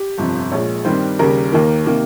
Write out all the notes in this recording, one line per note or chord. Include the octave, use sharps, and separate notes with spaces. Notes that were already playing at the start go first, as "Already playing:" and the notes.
Already playing: G4
G1 F2 C3 F3
A#1 A#2 G#3 C#5
G2 D#3 G3 C4 C5
D#2 C#3 G3 A#4
D#2 D#3 A#3
C3 D#3 A#3